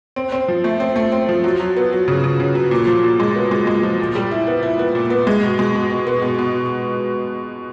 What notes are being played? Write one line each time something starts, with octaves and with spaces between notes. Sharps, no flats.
C4
C4
F3
A3
C4
A3
C4
F3
F#3
F#3
B3
F#3
C#3
C#3
C#3
F#3
A#2
F3
A#2
G#3
B3
G#3
G#3
F3
A#2
G3
E4
B3
E4
B3
A#2
B3
G#3
B2
G#3
B2
B2
B3
B2
B2